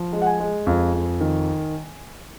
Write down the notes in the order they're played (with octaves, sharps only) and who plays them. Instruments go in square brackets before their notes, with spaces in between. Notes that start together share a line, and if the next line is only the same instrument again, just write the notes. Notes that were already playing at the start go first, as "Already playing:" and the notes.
Already playing: [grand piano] F3
G#3
F#5
G#5
G#3
F2
F2
D#3